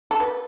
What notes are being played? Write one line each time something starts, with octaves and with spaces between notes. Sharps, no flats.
A4
B4